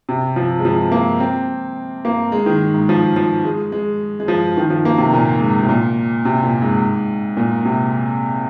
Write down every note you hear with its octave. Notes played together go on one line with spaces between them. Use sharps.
C3
F3
G#3
F3
A#3
C4
A#3
G#3
D#3
G#2
F3
F3
G#3
G#3
G#3
F3
D#3
F3
A#3
C3
A#2
G#2
C3
A#2
C3
A#2
G#2
A#2
C3